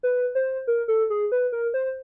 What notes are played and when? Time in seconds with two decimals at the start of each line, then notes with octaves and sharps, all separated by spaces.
0.03 B4
0.35 C5
0.67 A#4
0.88 A4
1.10 G#4
1.32 B4
1.52 A#4
1.74 C5